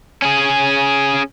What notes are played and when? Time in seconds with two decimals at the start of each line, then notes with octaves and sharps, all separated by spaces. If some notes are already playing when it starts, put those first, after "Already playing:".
0.22 C#4 G#4